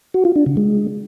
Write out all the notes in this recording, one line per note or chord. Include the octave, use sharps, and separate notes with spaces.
F#4
F4
D4
C#3
G#3